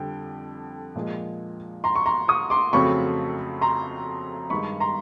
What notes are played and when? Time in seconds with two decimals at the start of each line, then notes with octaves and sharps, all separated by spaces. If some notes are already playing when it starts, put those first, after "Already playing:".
Already playing: F2 D3 G3 G5
0.96 A#2 F3 G#3
1.84 A#5 C6
1.95 C#6
2.06 A#5 C6
2.28 C#6 D#6
2.50 C6 D6
2.73 F2 C#3 F#3 A3 C4 B5 C#6
3.61 A#5 C6
4.50 G2 D#3 G#3 B5 C#6
4.80 A#5 C6